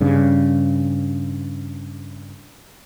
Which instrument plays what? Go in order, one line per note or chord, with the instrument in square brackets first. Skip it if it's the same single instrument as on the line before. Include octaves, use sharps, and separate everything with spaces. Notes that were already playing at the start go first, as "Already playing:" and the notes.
[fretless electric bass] G2 C#3